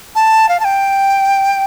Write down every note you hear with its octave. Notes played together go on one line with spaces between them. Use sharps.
A5
F5
A5
G5